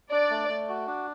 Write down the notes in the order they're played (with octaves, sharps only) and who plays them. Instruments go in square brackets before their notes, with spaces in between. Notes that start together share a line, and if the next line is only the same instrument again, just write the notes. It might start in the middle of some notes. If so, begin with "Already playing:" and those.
[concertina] D4 [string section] D5
[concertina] A3
A3
F#4
D4